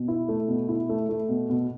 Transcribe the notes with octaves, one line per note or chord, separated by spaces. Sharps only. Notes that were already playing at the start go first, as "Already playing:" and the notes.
Already playing: B2
E4
A3
B2
E4
A3
A3
B2
B2